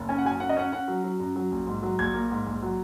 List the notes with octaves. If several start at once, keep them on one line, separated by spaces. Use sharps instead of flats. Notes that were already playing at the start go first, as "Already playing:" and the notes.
Already playing: F#1
C#4 G#5
F#5
F#2 G#5
C#4 F#5
D#5
C#4 F#5
C#4 F#5
F#3
F#3
F#2
F#3
A#1
G#2
F#3
A#1 G#6
A#3
G#2
A#1
F#3